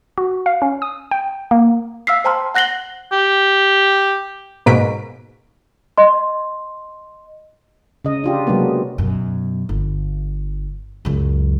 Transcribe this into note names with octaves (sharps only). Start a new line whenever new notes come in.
F#4
F5
C#4
D#6
G5
A#3
F5 E6 F6 B6 C7
C5 G5 A5 A#5 C6 F6
F#5 F#6 A#6 C7 F#7 G7
G4
G#2 B2 A#3 B6 D7
D#5 C6
C#3 D#5
D4 F4 G4
C3 F#3 G#3 A#3 B3
F#2 B2
G1
C#2 F#2